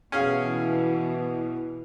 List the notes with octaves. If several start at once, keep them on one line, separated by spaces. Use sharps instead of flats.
B2 E3 C#4 G#4 F5